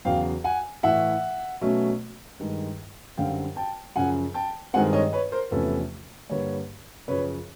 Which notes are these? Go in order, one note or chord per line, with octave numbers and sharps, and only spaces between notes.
E2 C#3 F#3 F5 G5
F#5 G#5
A2 E3 A3 E5 F#5
B2 F#3 A3 C#4
G2 D#3 G#3
F#2 D3 G3 C4 F5 G5
G5 A5
F#2 C#3 F3 F#5 G#5
G5 A5
G2 D#3 G#3 C4 F#5 G#5
C#5 D#5
B4 C#5
A#4 C5
E2 C3 F3 A3 C#4 A4 B4
G2 D3 G3 A#3 B4 C#5
F#2 C#3 F3 B4 C#5